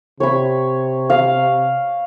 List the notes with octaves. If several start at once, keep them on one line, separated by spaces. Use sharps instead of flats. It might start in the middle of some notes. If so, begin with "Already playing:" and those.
C3 C#5 B5
F5